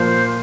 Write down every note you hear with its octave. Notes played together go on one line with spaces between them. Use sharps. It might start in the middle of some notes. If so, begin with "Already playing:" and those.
Already playing: A#2 F3 A#3 F4 C5